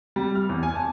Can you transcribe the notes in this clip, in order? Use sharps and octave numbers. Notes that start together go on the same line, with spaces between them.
G3
F6
E2
G#5
A5